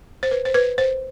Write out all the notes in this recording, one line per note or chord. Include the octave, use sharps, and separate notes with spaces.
C5
B4
C5
B4
C5